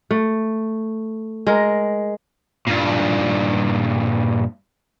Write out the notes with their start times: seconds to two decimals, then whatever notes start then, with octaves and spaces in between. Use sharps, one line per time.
0.11 A3
1.47 G#3 A#4
2.67 G2 A#2